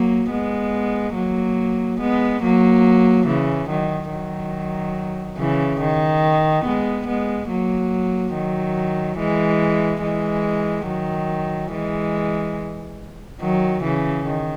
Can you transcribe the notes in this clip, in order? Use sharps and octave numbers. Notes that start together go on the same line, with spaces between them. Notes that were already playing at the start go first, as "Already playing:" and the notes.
Already playing: F#3 A#3
G#3 B3
F#3 A#3
G#3 B3
F#3 A#3
C#3 E3
D#3 F#3
D#3 F#3
C#3 E3
D#3
G#3 B3
G#3 B3
F#3 A#3
D#3 F#3
E3 G#3
E3 G#3
D#3 F#3
E3 G#3
D#3 F#3
C#3 E3
D#3